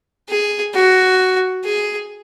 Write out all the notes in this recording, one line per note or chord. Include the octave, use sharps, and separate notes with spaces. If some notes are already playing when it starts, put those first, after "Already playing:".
G#4
F#4
G#4